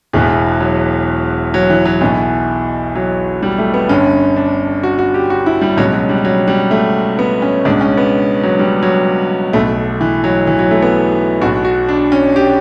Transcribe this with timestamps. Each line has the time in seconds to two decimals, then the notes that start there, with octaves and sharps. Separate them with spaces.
0.13 E1 E2 B2 E3
0.60 F#3
1.54 F#3
1.70 E3
1.85 F#3
2.01 B1 B2 E3
2.95 F#3
3.43 G3
3.58 A3
3.74 B3
3.89 G1 G2 D3 C#4
4.36 D4
4.83 F#4
4.99 F#4
5.14 G4
5.30 F#4
5.46 E4
5.61 G3
5.77 C#2 B2 F#3
5.93 F#3
6.09 G3
6.25 F#3
6.48 G3
6.71 A3
7.19 B3
7.42 C#4
7.65 C#2 D4
7.70 B2
7.81 C#4
7.97 B3
8.43 F#3
8.59 G3
8.83 F#3
9.53 B1 B2 A3
10.01 E3
10.24 F#3
10.47 E3
10.59 F#3
10.71 A3
10.82 B3
11.41 B1 F#4
11.46 B2
11.65 F#4
11.89 D4
12.12 C#4
12.36 G4